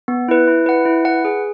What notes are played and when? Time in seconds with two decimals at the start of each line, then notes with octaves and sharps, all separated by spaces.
0.08 B3
0.28 E4 B4
0.48 E4
0.66 B4 F#5
0.85 E4
1.05 B4 F#5
1.25 G#4